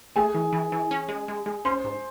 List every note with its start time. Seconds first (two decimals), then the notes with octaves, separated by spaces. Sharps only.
0.16 A3 G#4 G#5
0.35 E3
0.53 E3
0.72 E3
0.91 C#4
1.09 G#3
1.28 G#3
1.46 G#3
1.65 C#4 C5 C6
1.84 G#2